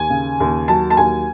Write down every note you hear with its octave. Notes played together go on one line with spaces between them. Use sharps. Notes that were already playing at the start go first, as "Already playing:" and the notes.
Already playing: D#2 G#5
C#3
D#2
F#3 A5
A5
D#2 G#5